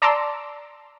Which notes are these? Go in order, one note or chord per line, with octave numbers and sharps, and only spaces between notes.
D5 A5 A#5 C6 D6 E6